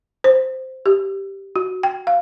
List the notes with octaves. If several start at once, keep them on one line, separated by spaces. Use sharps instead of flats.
C5
G4
F#4
G5
F5